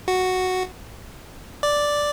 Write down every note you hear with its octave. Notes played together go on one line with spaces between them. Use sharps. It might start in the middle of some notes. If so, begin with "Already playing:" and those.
F#4
D5